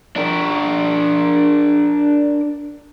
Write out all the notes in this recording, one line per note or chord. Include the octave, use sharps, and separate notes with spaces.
D4 A#4